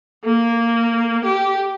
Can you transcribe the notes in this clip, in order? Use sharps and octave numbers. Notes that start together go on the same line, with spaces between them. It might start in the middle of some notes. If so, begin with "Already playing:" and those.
A#3
G4